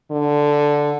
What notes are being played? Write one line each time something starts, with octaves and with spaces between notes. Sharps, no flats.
D3